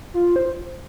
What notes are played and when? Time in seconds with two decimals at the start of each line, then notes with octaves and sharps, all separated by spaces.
0.14 F4
0.36 C5